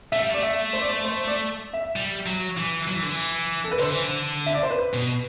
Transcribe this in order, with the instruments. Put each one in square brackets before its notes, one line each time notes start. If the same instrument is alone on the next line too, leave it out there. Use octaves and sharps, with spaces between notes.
[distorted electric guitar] A3 [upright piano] E5
[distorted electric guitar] G3
[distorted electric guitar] A3 [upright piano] D5
[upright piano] E5
C5
D5
C5
C5
D5
E5
[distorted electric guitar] G3
F#3
E3
F#3
E3
D3
E3
[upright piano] A4
B4
[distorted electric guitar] D3 [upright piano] C5
[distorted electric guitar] E3
D3
[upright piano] E5
D5
C5
B4
[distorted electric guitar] B2